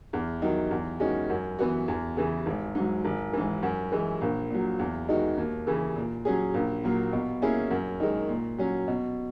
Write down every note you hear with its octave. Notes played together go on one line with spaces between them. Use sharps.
E2
D#3 F#3
E2
D#3 G#3 C#4 F#4
F#2
E3 B3 F#4
E2
C#3 E3
G#1
G#2 F#3
G#1
G#2 E3
F#2
E3 G#3
A#1
A#2 F#3
E2
D#3 G#3 D#4 F#4
D#2
C#3 E3
A#2
F#3 C#4 G#4
A#1
A#2 F#3 A#3
B2
A#3 C#4 E4 G#4
F#2
D#3 G#3
A#2
F#3 C#4 F#4
B2